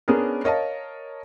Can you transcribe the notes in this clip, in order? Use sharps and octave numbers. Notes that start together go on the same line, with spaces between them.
B3 C#4 D4 G#4 A#4
A#4 C#5 D#5 F5 A5